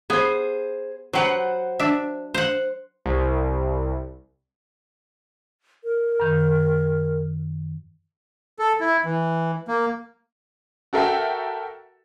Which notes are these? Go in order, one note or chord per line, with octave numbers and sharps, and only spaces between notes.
B3 G#4 C5
F#3 B4 C5 F#5
D4 E5
C5 F#5
C2
A#4
F#2 D#3
A4
E4
E3
A#3
F#4 A4 A#4 E5 F#5 G5